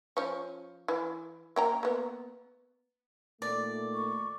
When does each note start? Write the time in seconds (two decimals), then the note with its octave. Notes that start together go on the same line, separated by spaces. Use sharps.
0.17 F3 C#4
0.88 E3
1.56 A#3 G5 A#5
1.83 A#3 B3
3.42 A#2 D#3 A3 D5
3.94 C#6